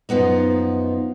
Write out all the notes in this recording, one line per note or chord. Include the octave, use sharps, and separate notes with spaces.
F#2 F3 B3 D#4